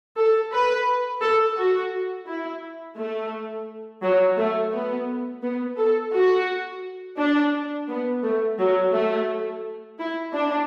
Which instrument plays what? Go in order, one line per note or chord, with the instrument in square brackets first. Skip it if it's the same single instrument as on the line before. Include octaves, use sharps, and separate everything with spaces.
[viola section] A4
B4
A4
F#4
E4
A3
F#3
A3
B3
B3
A4
F#4
D4
B3
A3
F#3
A3
E4
D4